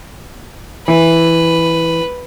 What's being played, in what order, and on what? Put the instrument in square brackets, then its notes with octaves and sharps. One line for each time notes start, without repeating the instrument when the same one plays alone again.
[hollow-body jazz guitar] E3 [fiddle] B4